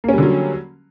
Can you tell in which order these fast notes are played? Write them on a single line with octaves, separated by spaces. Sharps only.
A#3 C#4 G3 D3 F#3